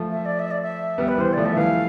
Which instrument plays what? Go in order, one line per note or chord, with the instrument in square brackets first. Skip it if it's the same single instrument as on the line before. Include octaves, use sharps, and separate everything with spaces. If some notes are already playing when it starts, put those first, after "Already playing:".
Already playing: [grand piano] F3 A3
[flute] E5
D5
E5
D5
E5
[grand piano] G3 B3
[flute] B4
[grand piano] E3 G3 [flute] C5
[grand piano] F3 A3 [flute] D5
[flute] E5
[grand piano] A3
[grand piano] E3 G3 [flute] F5